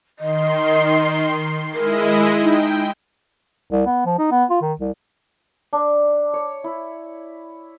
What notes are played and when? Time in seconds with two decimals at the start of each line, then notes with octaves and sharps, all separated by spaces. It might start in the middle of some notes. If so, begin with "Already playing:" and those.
0.19 D#3 D#5 C6 C7
1.73 G#3 E4 A#4 D#5
2.43 D#4 G5
3.72 C2
3.86 B3
4.06 F3
4.19 D#4
4.31 B3
4.50 F4
4.62 D#3
4.80 C2
5.73 D4
6.34 C#5
6.64 E4